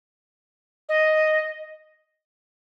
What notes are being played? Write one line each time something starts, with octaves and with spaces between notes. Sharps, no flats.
D#5